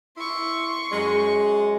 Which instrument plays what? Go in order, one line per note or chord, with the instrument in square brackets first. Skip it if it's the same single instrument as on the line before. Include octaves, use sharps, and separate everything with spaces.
[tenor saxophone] E4 [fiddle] C6 C#6
[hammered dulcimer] F#2 [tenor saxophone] G#3